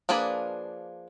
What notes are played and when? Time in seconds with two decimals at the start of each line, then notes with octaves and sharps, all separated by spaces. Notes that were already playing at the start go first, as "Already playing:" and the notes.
0.09 F3 A#3 D4 G#4 B4